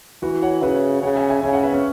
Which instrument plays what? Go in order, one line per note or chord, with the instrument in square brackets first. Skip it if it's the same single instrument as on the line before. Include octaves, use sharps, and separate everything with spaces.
[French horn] E3 [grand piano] F#4 B4
[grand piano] C#5 F#5
[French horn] C#3 [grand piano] B4 E5
[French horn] C#3 [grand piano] C#5 F#5
[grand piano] E5 G#5
E5 G#5
[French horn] C#3 [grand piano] E5 G#5
[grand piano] C#5 F#5
B4 E5
C#4